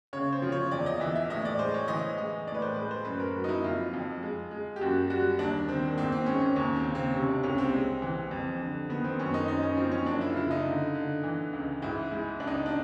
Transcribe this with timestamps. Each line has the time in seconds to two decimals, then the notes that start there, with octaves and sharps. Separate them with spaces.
0.13 C#3 C#5
0.33 C5
0.42 F3
0.52 C#5
0.71 E2 D5
0.86 D#5
1.00 E3 E5
1.15 E5
1.30 A2 D#5
1.45 D5
1.59 G#3 C5
1.74 C#5
1.88 E3 D#5
2.18 G#3 D#5
2.47 A2 D5
2.55 B4
2.62 C5
2.75 G#3 B4
2.91 C5
3.05 F#2 B4
3.19 A#4
3.35 F#3
3.44 D#4
3.49 E4
3.64 F2 F4
3.94 F2
4.22 G#3
4.51 G#3
4.76 G4
4.81 F#2 F#4
5.10 G3 F#4
5.39 D#2 D4
5.68 D#3 C4
5.98 G#2 C4
6.12 C4
6.26 G#3 C#4
6.41 C#4
6.56 D#2 C#4
6.76 C4
6.85 C#3
6.95 C4
7.14 C3 C#4
7.29 D4
7.43 C2 C#4
7.58 C4
7.73 G#3
8.02 E3
8.31 F2
8.61 D3
8.89 D#3 B3
9.04 C4
9.19 F#2 C#4
9.34 D#4
9.48 F#2 D#4
9.63 C#4
9.77 F3 C4
9.91 C#4
10.06 F#2 D4
10.21 E4
10.29 F4
10.35 C#3 E4
10.51 D#4
10.65 D3
10.95 D3
11.23 E3
11.53 C#2
11.82 G#2 E4
12.11 G#3 E4
12.40 C#2 D4
12.47 D#4
12.55 D4
12.66 D4